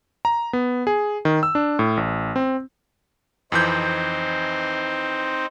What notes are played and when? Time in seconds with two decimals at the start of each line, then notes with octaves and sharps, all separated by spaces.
0.25 A#5
0.53 B3
0.87 G#4
1.25 D#3
1.43 E6
1.55 D4
1.79 A2
1.97 A1
2.36 C4
3.52 F2 E3 C4 D#4 C5 G6